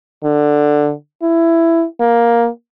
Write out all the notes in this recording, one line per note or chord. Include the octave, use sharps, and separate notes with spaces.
D3
E4
A#3